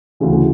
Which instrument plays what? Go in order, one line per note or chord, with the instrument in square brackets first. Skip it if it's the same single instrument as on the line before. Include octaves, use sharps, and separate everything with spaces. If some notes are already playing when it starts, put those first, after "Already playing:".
[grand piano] D2 C#3 E3